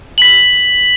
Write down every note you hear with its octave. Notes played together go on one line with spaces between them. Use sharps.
B6 F#7